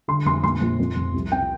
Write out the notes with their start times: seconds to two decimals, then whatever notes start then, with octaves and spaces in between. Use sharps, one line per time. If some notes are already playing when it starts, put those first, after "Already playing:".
0.08 D3 C6
0.25 F1 C6
0.43 A#1 C6
0.61 A#1
0.79 F2
0.96 F1
1.14 C2
1.32 C3 G5